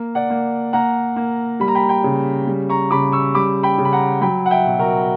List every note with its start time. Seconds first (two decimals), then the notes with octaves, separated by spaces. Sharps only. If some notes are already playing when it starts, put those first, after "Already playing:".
Already playing: A#3
0.15 D5 F#5
0.30 A#3
0.73 A#3 F#5 A#5
1.16 A#3
1.60 G3 B5
1.68 A#5
1.75 G5 B5
1.89 G5 B5
2.04 C#3
2.47 G3
2.69 A#5 C#6
2.91 C#3 B5 D6
3.12 C#6 E6
3.35 G3 B5 D6
3.63 G5 B5
3.78 C#3
3.85 B5
3.93 F#5 A#5
4.21 F#3 G5 B5
4.46 F#5
4.50 E5 G5
4.66 B2
4.79 F#4 A#4